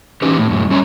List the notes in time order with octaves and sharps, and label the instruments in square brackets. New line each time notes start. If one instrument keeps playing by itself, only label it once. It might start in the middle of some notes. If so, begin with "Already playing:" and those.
[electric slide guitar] E3 C#4 D#4 G4 B4
A2
F#2 A2
G3 C#4 C#5 F#5 A#5